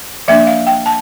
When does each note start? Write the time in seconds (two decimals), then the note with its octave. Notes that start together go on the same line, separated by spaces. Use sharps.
0.28 F3 A#3 D4 E5
0.47 F5
0.67 G5
0.86 A5